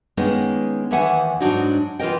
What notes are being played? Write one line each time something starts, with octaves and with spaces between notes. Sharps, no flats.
D#3 G#3 A#3 B3 C#4 D#4
D#2 D#3 E3 E5 F#5 G#5
G#2 D#3 F#3 D4 D#4 F#4
E3 F4 G4 A#4 D#5 G5